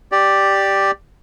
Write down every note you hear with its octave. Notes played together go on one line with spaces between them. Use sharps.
G4 D5